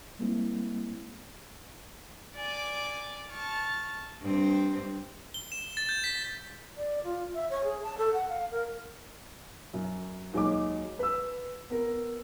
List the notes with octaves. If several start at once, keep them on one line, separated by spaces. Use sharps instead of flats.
G3 G#3 A#3 C4 E4
D5 G#5 D6
A5 C#6 F6
G2 C4
G7
E7
A6
G6
B6
D5
F4
E5
C#5
G#4
A5
A4
F#5
F5
A#4
F#2
D#2 F#3 G#3 C#5 D#5 D6
B4 E6
B3 A#4